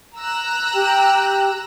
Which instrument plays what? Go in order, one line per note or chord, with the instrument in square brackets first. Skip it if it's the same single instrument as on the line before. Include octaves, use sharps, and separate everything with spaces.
[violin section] A#5 E6 F#6
[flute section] G4 G5